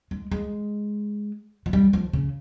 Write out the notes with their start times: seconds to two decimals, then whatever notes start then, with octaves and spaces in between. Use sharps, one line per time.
0.11 G#3
0.31 G#3
1.66 F3
1.73 G3
1.93 F3
2.13 C#3